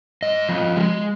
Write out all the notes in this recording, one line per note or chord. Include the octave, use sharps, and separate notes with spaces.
G#2 D#5
F3
G#3